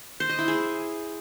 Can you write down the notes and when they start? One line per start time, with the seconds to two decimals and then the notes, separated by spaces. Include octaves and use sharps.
0.20 C5
0.29 D#5
0.39 E4
0.48 G#4